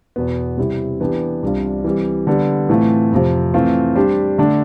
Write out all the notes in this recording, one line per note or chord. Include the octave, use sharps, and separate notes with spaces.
E2 B2 B3
C3 G3 C4 E4
E3 B3 D4 G4
C2 C3 G3 D4 F4
E3 G3 C4
D3 G3 B3
A2 E3 A3 C4 F4
F2 C3 F3
E3 A3 C4 F4
G3 D4 G4 C5
D3 A3 D4